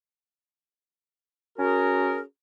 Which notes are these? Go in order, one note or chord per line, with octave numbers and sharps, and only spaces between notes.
C#4 F#4 G#4 A#4